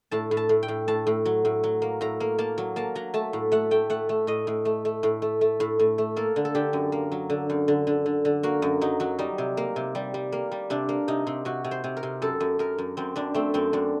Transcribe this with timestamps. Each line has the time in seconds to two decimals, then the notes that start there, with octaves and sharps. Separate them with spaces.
0.11 A2 A5
0.31 A2
0.37 A5
0.49 A2
0.63 G5
0.68 A2
0.88 A2 A5
1.07 A2
1.25 F#3
1.45 A2
1.64 F#3
1.82 A#3
2.01 A2 A#5
2.20 A#3
2.38 A#3 A5
2.58 F#3
2.76 A#3 A5
2.95 F#3 A#5
3.14 A3 A5
3.33 A2
3.52 A3 F#5
3.71 A3 G5
3.90 A3 F#5
4.09 A3
4.27 A2 D#5
4.47 A2
4.65 A3
4.85 A3
5.03 A2
5.22 A3
5.41 A3
5.60 A2
5.79 A2
5.98 A3
6.16 A#3 A4
6.36 D3
6.45 A4
6.55 D3 G4
6.73 F#2
6.92 A#3
7.12 F#3
7.30 D3
7.50 F#2
7.68 D3
7.87 D3
8.06 D3
8.25 D3
8.43 A#3 F#4
8.62 F#2
8.81 F#3 D#4
9.00 F#3 F#4
9.19 G3 D#4
9.38 C3
9.57 A#3
9.76 C3
9.95 G3
10.14 G3
10.32 A#3
10.52 G3
10.70 C3 D4
10.89 A#3
11.08 C3 D#4
11.27 C3
11.45 C3 F#4
11.64 C3
11.71 C5
11.84 C3
11.97 A#4
12.03 C3
12.22 F#2 A4
12.40 F#2
12.59 F#2 A#4
12.78 F#2
12.97 F#2 C4
13.16 F#2 D4
13.34 A3 C4
13.54 F#2 C4
13.73 F#2 D4